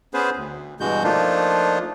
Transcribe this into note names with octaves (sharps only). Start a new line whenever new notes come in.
B3 C#4 G#4 B4 C5
D2
G2 B2 E3 G#3 F#4 G6
F3 A3 A#3 D4 D#4 F4